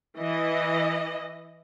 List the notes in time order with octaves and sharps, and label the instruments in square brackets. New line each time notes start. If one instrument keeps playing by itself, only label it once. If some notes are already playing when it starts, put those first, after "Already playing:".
[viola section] E3 D#5